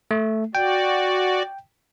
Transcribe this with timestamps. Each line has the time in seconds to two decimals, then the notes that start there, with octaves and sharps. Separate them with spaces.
0.11 A3
0.55 F#4 D5 G5